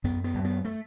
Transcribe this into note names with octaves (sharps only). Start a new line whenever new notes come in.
F#2 B3
B3
F#2
B3
A3